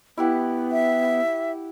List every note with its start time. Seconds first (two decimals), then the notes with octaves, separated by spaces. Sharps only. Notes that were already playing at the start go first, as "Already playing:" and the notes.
0.18 B3 E4 G4 F#5
0.71 E5